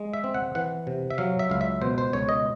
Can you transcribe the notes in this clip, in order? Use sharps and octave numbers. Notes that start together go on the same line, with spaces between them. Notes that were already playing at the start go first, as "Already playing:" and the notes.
Already playing: G#3
E5
C4
F#5
E3 F#5
C3
E5
F#3 F5
E5
C#2 F5
E5
B2 C5
C5
C#2 C#5
D#5